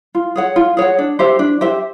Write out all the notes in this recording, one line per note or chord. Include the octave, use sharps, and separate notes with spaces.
F4
G#4 C#5 F#5
F4
G#4 C#5 F#5
D4
G4 C5 E5
D4
G4 C5 E5